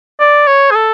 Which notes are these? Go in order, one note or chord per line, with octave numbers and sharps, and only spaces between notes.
D5
C#5
G#4
A4